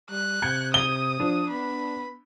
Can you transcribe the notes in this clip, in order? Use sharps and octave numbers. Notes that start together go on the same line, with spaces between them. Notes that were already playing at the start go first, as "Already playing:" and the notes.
G3 F#6
C3 G6 G#6 C#7
D#6 G7
F3 D4
B3 B5